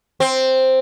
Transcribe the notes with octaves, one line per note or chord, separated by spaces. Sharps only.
C4